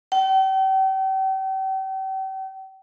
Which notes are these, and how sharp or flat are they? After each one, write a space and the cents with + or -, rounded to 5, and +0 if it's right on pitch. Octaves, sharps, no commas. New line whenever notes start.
G5 -40